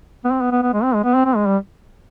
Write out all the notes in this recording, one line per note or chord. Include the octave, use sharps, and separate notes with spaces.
B3
C4
B3
B3
B3
G#3
C4
G#3
B3
C4
C4
G#3
G3